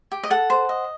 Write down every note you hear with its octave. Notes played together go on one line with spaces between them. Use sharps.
G4
D#5
A4 F#5
C5
D#5